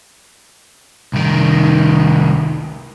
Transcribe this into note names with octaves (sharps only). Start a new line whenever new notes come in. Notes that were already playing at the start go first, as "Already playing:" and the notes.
C2 D#3